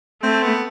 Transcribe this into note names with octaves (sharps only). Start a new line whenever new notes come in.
A3 C4
B3